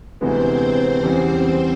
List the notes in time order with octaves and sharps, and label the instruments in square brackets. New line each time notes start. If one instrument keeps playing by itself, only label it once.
[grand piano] D2 C3 E3 G#3 B3 [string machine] C4 C5
[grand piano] E2 C#3 E3 G3 [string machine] C4 C5